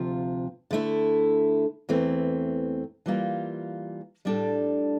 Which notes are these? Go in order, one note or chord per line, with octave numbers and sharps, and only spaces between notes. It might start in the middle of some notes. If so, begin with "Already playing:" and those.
Already playing: D2 C3 F3 F4
D3 A3 E4
E2 E3 A3 C4
E3 G3 A#3 F4
A2 G3 D4 A4 D5